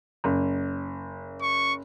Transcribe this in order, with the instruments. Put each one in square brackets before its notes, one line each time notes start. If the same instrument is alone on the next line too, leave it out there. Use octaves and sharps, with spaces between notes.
[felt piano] F#1
[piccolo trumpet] C#6